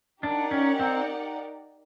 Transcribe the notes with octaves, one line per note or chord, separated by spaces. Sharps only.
D4 D#4 G4 A#4 D5 F#5
C#4
C4